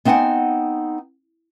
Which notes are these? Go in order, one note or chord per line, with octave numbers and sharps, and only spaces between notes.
B3 C4 D#4 E5 F#5 G#5